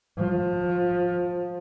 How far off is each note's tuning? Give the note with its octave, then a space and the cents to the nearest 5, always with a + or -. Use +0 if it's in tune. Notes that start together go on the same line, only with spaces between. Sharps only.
F3 +20